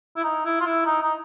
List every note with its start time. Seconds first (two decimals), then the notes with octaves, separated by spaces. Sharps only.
0.16 E4
0.24 D#4
0.45 E4
0.60 F4
0.65 E4
0.86 D#4
1.03 D#4